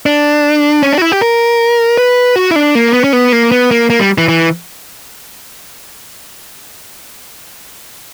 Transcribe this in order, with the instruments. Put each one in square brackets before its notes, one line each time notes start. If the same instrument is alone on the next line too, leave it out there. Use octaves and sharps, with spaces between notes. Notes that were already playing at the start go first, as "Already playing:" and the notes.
[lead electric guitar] D4
C#4
D4
F#4
E4
G4
A#4
B4
F#4
E4
D4
A#3
B3
C#4
B3
A#3
B3
A#3
A#3
G3
E3
E3